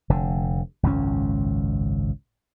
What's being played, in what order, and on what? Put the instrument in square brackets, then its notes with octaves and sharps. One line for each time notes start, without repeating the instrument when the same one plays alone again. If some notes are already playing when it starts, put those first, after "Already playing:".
[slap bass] F1 D3
G#1 C#2 F#2 C#4